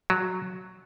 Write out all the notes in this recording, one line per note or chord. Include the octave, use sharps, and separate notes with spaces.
F#3